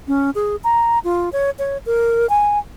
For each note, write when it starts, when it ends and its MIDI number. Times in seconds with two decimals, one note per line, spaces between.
0.08 0.30 61
0.35 0.56 68
0.64 0.99 82
1.04 1.29 65
1.33 1.50 73
1.59 1.78 73
1.86 2.29 70
2.29 2.59 80